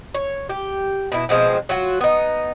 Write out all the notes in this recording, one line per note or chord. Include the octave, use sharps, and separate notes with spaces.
C#5
G4
B2 E4
B2 F3 G#3 C4
F#3 F4 F#4
B3 D#4